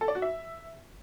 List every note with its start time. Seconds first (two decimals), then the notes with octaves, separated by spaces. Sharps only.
0.01 A4
0.08 D5
0.15 F#4
0.22 E5